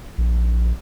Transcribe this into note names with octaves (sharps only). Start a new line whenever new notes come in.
A#1